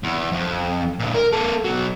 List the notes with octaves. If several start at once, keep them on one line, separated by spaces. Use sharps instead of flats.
E2
F2
A#2 D3
A#4
A#3 A4
B2 F#3